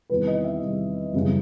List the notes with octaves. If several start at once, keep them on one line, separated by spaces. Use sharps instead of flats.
E2 C3 D#3 G3 B4
D#5
E5
E2 C3 D#3 G3
F#1 E2 C#3 E3 G3